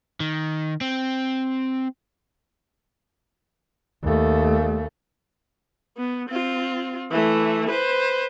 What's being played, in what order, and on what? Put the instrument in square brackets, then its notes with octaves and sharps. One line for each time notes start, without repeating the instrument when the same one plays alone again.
[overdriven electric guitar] D#3
C4
[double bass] D#2 A3
[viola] B3
C4 F4
E3 A3
B4 C5